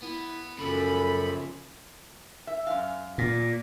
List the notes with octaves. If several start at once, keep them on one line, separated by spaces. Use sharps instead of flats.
B3 E4
F#2 C#3 F3 A4 B5
E5
F#2 F5
A#2